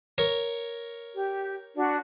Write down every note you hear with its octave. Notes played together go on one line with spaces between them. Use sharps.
A#4 C#5
G4
D4 F#4